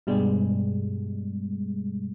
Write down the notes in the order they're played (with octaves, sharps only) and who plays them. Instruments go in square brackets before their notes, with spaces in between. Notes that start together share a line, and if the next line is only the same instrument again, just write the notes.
[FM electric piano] G2 B2 G3 G#3